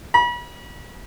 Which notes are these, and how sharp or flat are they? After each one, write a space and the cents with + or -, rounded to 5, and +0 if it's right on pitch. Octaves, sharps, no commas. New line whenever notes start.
B5 -40